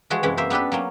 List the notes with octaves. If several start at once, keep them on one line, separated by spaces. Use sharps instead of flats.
E3 F3 G#3 F#4 G#4
F#2 C3 E3 G#3
A#3 C5 E5
B3 D4 G4 A4 B4
F#3 A#3 C#4